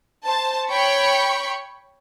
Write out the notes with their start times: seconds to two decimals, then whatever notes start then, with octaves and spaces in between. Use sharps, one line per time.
0.25 C5 A5
0.69 C#5 G5 B5 C#6